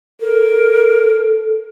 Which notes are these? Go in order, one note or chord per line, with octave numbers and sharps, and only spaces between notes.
A4 A#4